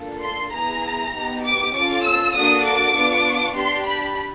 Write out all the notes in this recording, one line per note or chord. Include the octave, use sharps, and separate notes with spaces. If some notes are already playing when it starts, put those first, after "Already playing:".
Already playing: A#3 D4 F4 A4
C6
B3 E4 G#4 A#5
B3 D#4 G4
D6
C#4 F4 A4 D6
E6
A#3 D4 F#4 A4 D#6
D6
B3 D4 F4
D4 G4 C6
B5